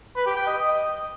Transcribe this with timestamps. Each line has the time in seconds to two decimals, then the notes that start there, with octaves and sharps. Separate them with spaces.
0.16 B4
0.26 G4
0.36 G5
0.47 D#5
0.57 D#5